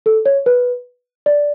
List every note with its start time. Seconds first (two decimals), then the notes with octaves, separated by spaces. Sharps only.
0.06 A4
0.26 C#5
0.46 B4
1.26 D5